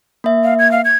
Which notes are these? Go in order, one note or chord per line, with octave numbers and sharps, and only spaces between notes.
A#3 E5
F5
G#6
F5
G#6